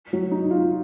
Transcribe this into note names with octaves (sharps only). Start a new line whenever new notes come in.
F#3
D#4
F4